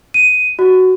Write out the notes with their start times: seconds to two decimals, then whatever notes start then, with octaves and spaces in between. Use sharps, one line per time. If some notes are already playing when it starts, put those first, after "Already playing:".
0.14 D#7
0.59 F#4